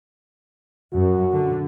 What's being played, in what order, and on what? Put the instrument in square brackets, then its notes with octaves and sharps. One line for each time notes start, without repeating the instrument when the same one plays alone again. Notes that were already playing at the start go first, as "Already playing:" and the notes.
[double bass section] F#2 [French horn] F#4
[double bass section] D3